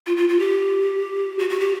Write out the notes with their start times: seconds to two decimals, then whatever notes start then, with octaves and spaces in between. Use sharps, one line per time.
0.07 F4
0.17 F4
0.29 F4
0.39 G4
1.39 F#4
1.50 F#4
1.60 G4